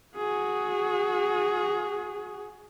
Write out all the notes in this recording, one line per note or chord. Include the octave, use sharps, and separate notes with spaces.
F#4 G#4